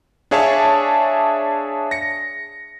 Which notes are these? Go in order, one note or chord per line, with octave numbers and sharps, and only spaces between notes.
D4 G#4 C#5 E5 F5 A5
A#6 C#7